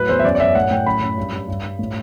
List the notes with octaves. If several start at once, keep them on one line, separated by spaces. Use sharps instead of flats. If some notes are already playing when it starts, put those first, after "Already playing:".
Already playing: A2 F#3 B4
E2 C5
E5
F#2 D5
D5
F#2 E5
A2 F#5
A2 G5
F#2 B5
F#2
G2
G2
G2
G2
A2